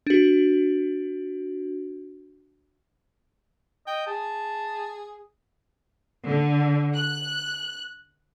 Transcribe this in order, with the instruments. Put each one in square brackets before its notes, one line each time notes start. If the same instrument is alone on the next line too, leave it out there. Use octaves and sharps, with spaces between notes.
[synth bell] D4 F#4
[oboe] D#5 [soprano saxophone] G5
[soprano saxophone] G#4 [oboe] A5
[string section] D3
F#6